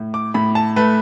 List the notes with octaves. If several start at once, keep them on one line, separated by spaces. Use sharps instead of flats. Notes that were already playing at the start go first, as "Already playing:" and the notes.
Already playing: A2
D6
A2 B5
A5
A3 B4